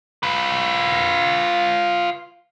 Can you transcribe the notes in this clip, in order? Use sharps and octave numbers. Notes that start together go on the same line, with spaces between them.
F4 B4